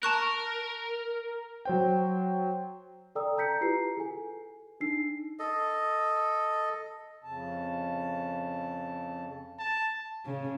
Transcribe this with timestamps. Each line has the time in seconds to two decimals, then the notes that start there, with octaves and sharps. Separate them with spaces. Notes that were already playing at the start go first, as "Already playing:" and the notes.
0.03 A#4 A5 C#6 F#6
1.65 F#3 C5 G5
3.15 A4 D5 G5 A#5 D#6 E6
3.37 A5 A#5 G6 B6 C#7
3.61 E4 F4 G4 B4 A#5 C7
3.97 G#4 A4 G#5
4.80 D4 D#4 E6 C7
5.39 A4 D#5
7.24 F2 C#3 A5
9.59 A5
10.25 C#3